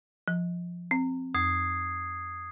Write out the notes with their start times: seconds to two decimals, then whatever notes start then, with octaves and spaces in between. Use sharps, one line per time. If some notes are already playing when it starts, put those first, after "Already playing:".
0.28 F3
0.91 C4
1.34 F2 D#6 G#6 C7